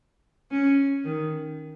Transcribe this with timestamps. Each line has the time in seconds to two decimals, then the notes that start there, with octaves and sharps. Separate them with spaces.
0.51 C#4
1.04 D#3